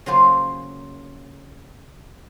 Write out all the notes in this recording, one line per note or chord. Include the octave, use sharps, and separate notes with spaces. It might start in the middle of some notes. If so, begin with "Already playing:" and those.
C#3 F#3 A#3 F4 G#4 C5